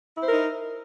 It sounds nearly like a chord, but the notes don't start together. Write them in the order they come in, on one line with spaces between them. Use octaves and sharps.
E4 C5 A#4 D#4